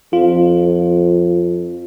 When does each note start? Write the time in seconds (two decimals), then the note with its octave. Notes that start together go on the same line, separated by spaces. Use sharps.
0.13 F2 F4